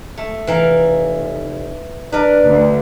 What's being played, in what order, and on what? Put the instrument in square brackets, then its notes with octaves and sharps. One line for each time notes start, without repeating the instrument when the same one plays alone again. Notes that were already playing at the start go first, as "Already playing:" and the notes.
[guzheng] A3
[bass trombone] F1 [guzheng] E3 A#4 F5
[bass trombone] D4 [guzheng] A#4 B4
[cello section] D2